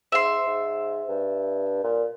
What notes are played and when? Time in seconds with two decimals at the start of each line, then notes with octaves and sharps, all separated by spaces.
0.12 G#2 E5 C6
0.46 G#2
1.08 G2
1.84 A#2